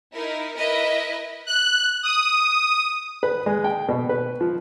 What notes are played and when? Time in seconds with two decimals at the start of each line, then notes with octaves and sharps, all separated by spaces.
0.13 D#4 E4 A#4
0.56 E4 A#4 B4 D#5 E5
1.46 F#6
2.03 D#6
3.23 B4
3.46 G#3
3.64 G5
3.89 B2
4.09 B4
4.41 F3